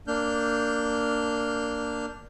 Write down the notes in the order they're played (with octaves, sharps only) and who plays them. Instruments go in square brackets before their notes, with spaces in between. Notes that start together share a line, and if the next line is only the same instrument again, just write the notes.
[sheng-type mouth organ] A#3 D4 F6 G6